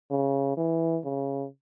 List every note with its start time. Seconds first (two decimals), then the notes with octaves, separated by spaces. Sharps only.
0.11 C#3
0.57 E3
1.04 C#3